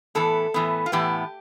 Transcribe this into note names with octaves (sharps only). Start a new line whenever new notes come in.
A2 E3 B3 A4
A2 E3 B3
F4
A2 E3 B3 G4